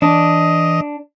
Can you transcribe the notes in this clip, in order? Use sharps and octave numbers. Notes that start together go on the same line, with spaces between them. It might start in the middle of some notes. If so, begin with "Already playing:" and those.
E3 D4 D#5